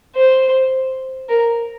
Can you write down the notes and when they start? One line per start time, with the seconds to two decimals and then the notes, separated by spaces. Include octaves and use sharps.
0.16 C5
1.29 A#4